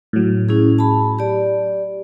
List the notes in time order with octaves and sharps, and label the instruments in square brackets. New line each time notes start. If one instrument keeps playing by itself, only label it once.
[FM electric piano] A2 F#3
[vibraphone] C#4 E4 G#4
A5 B5
G4 D5